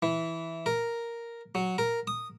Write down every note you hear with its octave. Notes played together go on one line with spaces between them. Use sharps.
E3
A#4
F#3
A#4
D#6